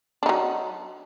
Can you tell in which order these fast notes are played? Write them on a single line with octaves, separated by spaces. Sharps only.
D4 D#4 F#3